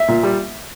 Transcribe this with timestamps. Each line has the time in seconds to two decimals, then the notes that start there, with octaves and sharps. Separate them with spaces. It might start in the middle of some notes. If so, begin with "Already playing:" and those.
Already playing: E5
0.08 A#2
0.23 G3